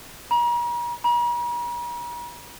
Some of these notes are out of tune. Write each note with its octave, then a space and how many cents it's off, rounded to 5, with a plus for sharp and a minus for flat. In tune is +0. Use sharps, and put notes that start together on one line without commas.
A#5 +40
A#5 +45